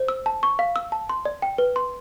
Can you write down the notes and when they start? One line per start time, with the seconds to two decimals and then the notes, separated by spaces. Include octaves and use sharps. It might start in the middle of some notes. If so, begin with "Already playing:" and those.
Already playing: C5
0.08 E6
0.26 A5
0.43 C#6
0.59 F5
0.76 E6
0.92 A5
1.09 C6
1.25 D5
1.42 G5
1.58 B4
1.76 C6